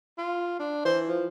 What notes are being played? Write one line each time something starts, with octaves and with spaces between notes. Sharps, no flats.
F4
D4
E3 C5
F3